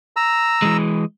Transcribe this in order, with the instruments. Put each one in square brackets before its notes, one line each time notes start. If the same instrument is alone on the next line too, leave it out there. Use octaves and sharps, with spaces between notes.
[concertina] A#5 E6
[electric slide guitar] E3 G#3